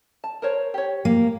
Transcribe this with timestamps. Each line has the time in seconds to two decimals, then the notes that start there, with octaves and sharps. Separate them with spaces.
0.24 A5
0.42 A#4 C5 C#5
0.74 G4 C#5
1.05 A#3